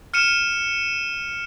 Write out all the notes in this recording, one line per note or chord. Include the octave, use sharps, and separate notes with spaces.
F6 C#7 D#7 E7